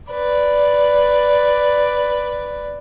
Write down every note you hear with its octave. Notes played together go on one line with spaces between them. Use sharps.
B4 D5